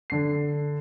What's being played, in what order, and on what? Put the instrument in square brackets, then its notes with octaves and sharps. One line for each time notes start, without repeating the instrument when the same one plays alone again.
[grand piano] D3 C7